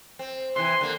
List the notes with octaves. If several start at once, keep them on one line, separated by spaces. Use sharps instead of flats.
C4
C3 E3 C6
D3 A#3